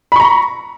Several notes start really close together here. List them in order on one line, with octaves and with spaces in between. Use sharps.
B5 C#6 A#5